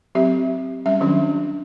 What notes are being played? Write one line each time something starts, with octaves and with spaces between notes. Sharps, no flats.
F#3 C4 G4 E5
G3 C#4 E5
D#3 F#3 C#4 D4